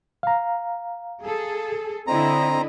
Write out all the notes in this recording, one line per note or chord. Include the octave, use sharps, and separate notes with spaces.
F5 A#5
G#4 A4
D3 C4 E4 D#5 A#5